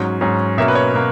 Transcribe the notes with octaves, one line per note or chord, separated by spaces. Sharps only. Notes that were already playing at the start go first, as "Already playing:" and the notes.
Already playing: G#2 F#3 C#4
G#2 F#3 C#4
B2 A#3 C#4 E5
B4
C#5
B2 A#3